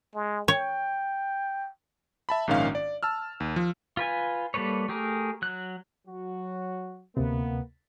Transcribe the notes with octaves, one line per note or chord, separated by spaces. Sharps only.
G#3
C#5 G5
E5 A5 B5
A#1 G#2 D#3 C#4 F5
D5
A5 E6 F6
D#2
F3
F4 B4 G#5
G3 A#3 A4 B4 C#5
A3 G4 G#4 A#4
F#3 F#6
F#3 F#4
D2 C3 A#3 B3